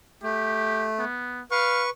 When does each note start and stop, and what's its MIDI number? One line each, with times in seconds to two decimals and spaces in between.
0.23 1.05 57
0.23 0.87 67
0.99 1.41 59
1.51 1.90 71
1.51 1.83 77
1.51 1.90 85